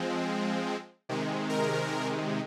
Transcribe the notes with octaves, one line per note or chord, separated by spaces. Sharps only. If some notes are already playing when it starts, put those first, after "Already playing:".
Already playing: F3 G#3 C4
C3 D#3 G#3
A#4